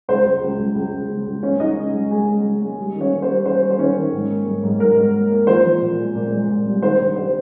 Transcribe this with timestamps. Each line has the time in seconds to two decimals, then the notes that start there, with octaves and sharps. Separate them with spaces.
0.08 C#2 C5
0.25 C#2
0.43 C#2
0.59 C#2
0.75 C#2
0.93 C#2
1.09 C#3
1.26 C#2
1.43 C#3 C#4 C#5
1.59 C#2 D#4 D#5
1.77 C#3
1.94 C#2
2.11 G#3 G#4 G#5
2.27 G#3
2.44 C#3
2.62 G#3
2.78 G3
2.95 D#3
3.00 C#4 C#5
3.11 A#3
3.22 C5
3.28 G3
3.45 G3 C5
3.63 A#3
3.70 C5
3.78 D#3 C#4 C#5
3.96 D#3
4.12 G#2
4.30 A#3
4.46 G#2
4.63 G#2
4.80 G#2 A#4
4.96 G#2
5.14 A#3
5.31 A#3
5.47 F3 C5
5.65 F3
5.81 A#2
5.98 G#3
6.15 A#2
6.32 G#3
6.49 A#2
6.65 C2
6.82 D#3 C5
6.99 G2
7.15 G2 C5